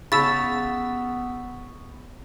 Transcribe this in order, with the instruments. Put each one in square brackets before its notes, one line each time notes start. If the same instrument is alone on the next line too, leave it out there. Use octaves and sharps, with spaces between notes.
[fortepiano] C#3 [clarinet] B3 [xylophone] A5 E6 A6 [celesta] B5 C#6 B6